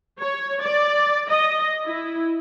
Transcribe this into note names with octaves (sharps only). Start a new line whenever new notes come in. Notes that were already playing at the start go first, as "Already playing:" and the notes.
C#5
D5
D#5
E4